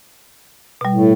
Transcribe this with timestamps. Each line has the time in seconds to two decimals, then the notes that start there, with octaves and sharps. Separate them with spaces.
0.81 B2 G3
0.94 A2